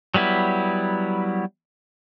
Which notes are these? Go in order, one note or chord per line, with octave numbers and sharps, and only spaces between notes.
F#3 G3 B3 E4